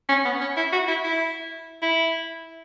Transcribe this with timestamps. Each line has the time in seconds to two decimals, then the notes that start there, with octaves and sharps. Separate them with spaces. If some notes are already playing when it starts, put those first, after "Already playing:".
0.09 C#4
0.25 B3
0.41 C#4
0.57 E4
0.73 F#4
0.88 E4
1.04 E4
1.82 E4